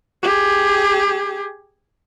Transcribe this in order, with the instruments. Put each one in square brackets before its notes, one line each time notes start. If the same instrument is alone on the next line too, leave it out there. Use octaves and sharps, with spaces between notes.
[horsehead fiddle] G4 G#4